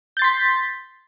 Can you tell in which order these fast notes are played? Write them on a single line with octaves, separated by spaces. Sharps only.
G6 A6 C6 B6